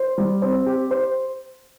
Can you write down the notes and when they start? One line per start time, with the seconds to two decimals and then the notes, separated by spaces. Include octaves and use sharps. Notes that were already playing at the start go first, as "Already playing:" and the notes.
Already playing: C5
0.18 G3
0.42 C4
0.66 G4
0.91 C5